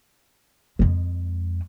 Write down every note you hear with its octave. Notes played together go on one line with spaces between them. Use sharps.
F2 G#3